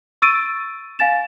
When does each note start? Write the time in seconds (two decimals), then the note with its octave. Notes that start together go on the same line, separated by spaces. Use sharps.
0.22 C#6 E6 A6 D7 D#7
0.99 F5 G#5 A6 E7